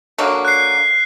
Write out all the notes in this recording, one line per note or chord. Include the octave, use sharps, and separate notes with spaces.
D3 F#3 A#3
F#6 C7